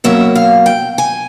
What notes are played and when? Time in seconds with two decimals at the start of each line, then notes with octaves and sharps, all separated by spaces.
0.04 B2 F#3 A#3 C#4 E5
0.35 F5
0.66 G5
0.98 G#5